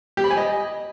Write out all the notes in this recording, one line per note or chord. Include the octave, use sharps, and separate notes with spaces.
G4
B5
G#5
D#5